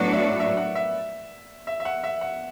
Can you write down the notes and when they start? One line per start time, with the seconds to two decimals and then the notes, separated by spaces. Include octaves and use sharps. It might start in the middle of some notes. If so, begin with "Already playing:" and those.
Already playing: A2 F#3 B3 D4 F#4 B4
0.13 E5
0.21 D5
0.40 E5
0.57 F#5
0.75 E5
1.67 E5
1.80 E5
1.85 F#5
2.04 E5
2.21 F#5